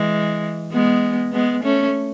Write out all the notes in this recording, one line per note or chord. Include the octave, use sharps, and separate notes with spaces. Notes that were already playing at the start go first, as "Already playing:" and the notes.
Already playing: E3 G#3
G#3 B3
G#3 B3
A3 C#4